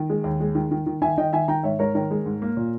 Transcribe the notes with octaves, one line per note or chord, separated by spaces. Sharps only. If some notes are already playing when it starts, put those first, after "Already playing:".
Already playing: D#3
G#3
D#2
G#3
D#3
D#3
D#3
D#3 E5 G#5
D#3 D#5 G5
D#3 E5 G#5
D#3 G5 A#5
G#2 C#5 E5
G#2 A#4 C#5
D#3 A#4 C#5
G#3
G#2
A#3
A#2